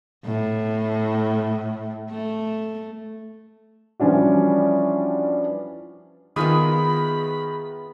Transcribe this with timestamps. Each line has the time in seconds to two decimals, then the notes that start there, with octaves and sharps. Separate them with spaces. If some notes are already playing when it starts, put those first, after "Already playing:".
0.25 A2
2.10 A3
4.00 E3 F3 G3 C#4 D4 F#4
6.36 D#3 B3 E4 F4 G#4 B5 D#6